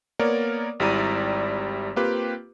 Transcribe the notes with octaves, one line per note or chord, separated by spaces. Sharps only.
A#3 B3 A#4 C#5 D5
G#1 G3 E4 D5 A#5 D#7
A#3 C4 F4 G4 B4